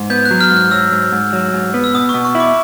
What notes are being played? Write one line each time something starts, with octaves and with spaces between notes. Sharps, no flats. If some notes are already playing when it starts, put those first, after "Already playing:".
Already playing: G#2
B3 G6
F#6
F#3
F6
G#2
F#6
F#3 E6
G#2
G#2
F#3
G#2
B3
E6
B2 D#6
C#6
B2
C#6
E4
D6